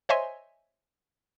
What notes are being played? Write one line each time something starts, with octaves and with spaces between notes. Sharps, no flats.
C5 C#5 D#5 E5 G#5 C6